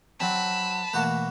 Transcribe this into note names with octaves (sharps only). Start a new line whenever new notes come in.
F#3 C4 A5 B5
B2 E3 A3 A#3 F#4 B4